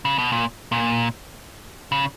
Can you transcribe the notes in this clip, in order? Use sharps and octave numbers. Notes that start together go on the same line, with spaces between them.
C#3
B2
A#2
A#2
C#3